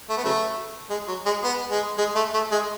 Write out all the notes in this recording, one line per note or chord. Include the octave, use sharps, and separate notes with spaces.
A3
B3
C#3 F#3 A3
G#3
F#3
G#3
B3
G#3
G#3
A3
A3
G#3